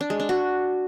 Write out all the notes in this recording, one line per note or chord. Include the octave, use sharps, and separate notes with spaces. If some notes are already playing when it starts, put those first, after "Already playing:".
D4
G#3
D4
F#4